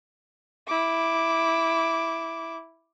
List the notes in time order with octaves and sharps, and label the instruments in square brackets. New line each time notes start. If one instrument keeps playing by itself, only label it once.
[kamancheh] E4 D6